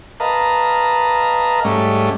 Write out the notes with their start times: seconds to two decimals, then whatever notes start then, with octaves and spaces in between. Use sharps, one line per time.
0.20 A#4 B4 D#5 F5 A5 A#5
1.65 G#2 G3 A3 C#4